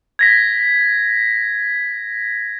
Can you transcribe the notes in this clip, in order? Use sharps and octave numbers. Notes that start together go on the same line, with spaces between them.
G#6 A#6 B6